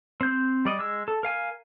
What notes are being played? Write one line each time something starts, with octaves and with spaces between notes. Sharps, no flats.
C4 G6
G3 D5 D#5
G#3 E6
A4
A#4 F5 G#5